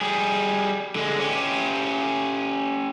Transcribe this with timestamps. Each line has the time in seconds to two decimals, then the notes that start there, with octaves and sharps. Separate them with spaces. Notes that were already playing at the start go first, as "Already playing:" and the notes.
0.01 G3 G#4
0.95 D3 G#3
1.20 C#4 G4